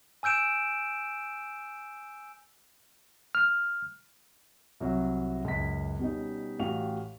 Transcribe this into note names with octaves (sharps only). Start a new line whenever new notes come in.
G#5 E6 G6 D7 E7
F6
C2 F#3 E5
C#2 F#2 B6
B2 G3 C#4 D#4
A1 F#4 G4 F5 F7